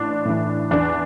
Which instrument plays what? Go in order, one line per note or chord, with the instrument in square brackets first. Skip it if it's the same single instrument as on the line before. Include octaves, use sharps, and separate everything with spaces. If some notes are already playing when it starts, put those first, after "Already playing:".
Already playing: [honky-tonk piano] A1 D4
A2 E3
E2 D4